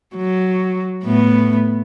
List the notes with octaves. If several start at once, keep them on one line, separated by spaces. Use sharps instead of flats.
F#3
A2 A3 B3